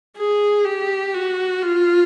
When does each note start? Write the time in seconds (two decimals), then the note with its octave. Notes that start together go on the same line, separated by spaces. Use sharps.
0.17 G#4
0.65 G4
1.14 F#4
1.63 F4